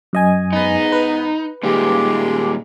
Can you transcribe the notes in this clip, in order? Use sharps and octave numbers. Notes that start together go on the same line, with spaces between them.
F#2 D#5 G#5
G#2 B3 D#4
B4
A#2 D#3 G3 G#3 G4